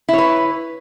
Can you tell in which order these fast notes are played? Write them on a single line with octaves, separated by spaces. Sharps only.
E4 C#5 B4